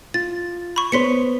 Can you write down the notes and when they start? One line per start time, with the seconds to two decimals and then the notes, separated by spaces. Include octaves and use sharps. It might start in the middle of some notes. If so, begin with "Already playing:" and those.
0.14 F4 A6
0.76 B5 C#6
0.92 B3 C5 C#5 C6 B6 C#7